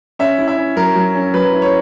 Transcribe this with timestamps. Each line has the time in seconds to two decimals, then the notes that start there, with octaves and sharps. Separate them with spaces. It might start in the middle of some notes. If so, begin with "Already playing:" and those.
0.19 C#4 E5
0.38 E4
0.48 E5
0.57 C#4
0.76 F#3 A#4
0.96 F#3
1.14 C#4
1.34 F#3 B4
1.53 E4
1.62 C#5